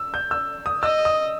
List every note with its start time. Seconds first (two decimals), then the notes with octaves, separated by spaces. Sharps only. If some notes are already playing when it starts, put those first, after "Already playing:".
Already playing: E6
0.14 G6
0.31 E6
0.66 D#6
0.83 D#5 E6
1.05 D#6